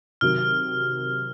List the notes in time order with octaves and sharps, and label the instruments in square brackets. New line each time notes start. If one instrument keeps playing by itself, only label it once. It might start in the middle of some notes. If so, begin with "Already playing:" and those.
[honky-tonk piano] C3 D#3 F#3 [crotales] F6